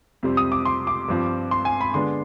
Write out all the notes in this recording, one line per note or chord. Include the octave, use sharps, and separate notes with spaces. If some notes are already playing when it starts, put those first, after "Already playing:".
F2 C3 G3 C4
D#6
D6
C6
D6
G2 F3 C4
C6
G#5
B5
D3 G#3 B3 D4 C6